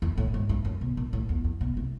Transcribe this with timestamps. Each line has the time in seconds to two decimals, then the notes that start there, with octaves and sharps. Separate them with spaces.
0.02 E2
0.18 A2
0.34 G#2
0.49 G2
0.65 F#2
0.81 B2
0.97 A#2
1.13 A2
1.29 E2
1.44 F2
1.61 B2
1.77 C3